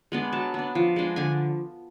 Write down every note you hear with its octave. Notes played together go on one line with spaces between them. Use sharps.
G#3 B3 D4
F#3 A5
B3 D4
F3
G#3 D4
D3 G#5